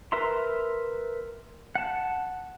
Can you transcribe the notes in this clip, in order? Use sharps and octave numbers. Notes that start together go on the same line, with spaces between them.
A#4 B4 E5 A#5 C6
F#5 A5